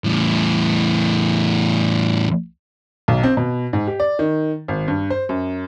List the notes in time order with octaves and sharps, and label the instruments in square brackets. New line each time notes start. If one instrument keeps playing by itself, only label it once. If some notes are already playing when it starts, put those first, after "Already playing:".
[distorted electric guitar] E2 A2
[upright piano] B1
C4
B2
G#2
G4
D5
D#3
G#1
G2
C5
F#2